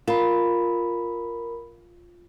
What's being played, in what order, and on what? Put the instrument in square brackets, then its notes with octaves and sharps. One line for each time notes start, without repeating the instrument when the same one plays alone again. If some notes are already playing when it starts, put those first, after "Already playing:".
[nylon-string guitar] F4 [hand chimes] A#4 B5